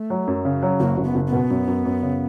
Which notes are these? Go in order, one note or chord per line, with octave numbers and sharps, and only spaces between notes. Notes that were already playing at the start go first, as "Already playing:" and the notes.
Already playing: A3
F#3
F#2
C#3
F#3
F#1 A#3
F#1
B3
F#1
B3
B2
F#2
F#2
F#2
C#3